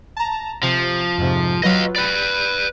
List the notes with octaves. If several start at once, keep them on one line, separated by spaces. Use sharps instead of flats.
A5 A#5
C3 F3
F2 G#2 C3
F#3 F4 B4 D#5 F5
B4 D5 B5